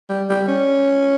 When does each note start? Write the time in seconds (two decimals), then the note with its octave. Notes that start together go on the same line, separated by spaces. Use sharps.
0.09 G3
0.29 G3
0.48 C#4